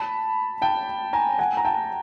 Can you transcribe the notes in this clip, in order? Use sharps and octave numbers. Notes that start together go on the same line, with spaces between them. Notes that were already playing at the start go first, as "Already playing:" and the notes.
Already playing: A5 B5
G5 A5
G#5 A#5
F#5 G#5
A#5
G5 A5